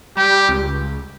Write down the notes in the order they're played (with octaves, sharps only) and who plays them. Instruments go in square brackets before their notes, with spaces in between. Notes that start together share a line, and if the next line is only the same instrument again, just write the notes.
[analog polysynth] G3 [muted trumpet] G4
[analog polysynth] C#2